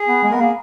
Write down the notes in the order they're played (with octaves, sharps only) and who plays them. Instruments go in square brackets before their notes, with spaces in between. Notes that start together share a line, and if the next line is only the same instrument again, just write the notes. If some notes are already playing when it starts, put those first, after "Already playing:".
Already playing: [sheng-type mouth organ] G#4
[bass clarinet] B3
G#3
[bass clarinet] B3 [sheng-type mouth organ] A#4
[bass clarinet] A#3 [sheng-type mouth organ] G#4